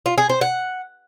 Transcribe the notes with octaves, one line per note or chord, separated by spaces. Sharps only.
F4
G#4
C5
F#5